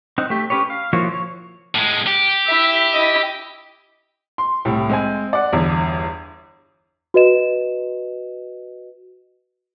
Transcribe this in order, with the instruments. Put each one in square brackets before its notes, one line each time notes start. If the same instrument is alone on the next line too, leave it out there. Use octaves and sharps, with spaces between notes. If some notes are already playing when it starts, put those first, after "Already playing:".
[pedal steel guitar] C4 D#4 F#5
A3 G4
C#4 G4 B4 C#5
F5
F3 A#3 E4 F#4 C#5
C#5
[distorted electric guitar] A2 G#3
G4
[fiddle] E4 E5
E4 D#5
[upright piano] C6
C2 A2
G#3 C4 G#5
D5 F#5
G1 E2
[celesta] F#4 B4 D#5 E7